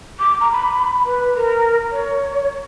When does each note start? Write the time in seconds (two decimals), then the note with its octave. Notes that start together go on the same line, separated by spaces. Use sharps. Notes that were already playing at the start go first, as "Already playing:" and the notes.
0.19 D6
0.40 A#5
0.52 B5
1.06 B4
1.37 A#4
1.92 C#5